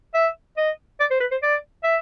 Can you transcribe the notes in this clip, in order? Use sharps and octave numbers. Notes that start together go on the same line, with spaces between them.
E5
D#5
D5
C5
B4
C5
D5
E5